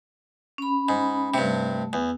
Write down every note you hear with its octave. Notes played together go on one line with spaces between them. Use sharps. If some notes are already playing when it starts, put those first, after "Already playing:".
C#4 B5
G#2
G2 C3 A3
E2